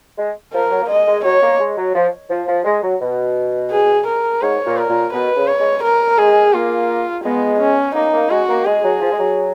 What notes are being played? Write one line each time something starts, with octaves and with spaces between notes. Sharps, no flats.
G#3
F3 A#4
F#3
A#3
G#3 D#5
G#3
F#3 C#5
A#3
G#3
F#3
F3
F3
F3
G#3
F#3
B2
G#4
A#4
G#2 C#5
A#2
A#4
A#2
B2 B4
C#3
C#5
G#3
A#4
G#3 G#4
A#3 F4
G#3 B3
C#4
A#3 D#4
A#3
G#3 F#4
A#3
G#3 G#4
F#3
F3
G#3
F#3